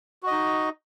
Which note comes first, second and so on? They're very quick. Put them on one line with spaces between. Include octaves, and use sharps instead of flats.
F#4 D#5 D#4